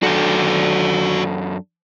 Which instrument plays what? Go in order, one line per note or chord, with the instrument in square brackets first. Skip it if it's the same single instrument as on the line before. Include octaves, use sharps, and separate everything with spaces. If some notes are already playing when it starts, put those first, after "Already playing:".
[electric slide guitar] F#2 D4 A4 [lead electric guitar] F#4 D5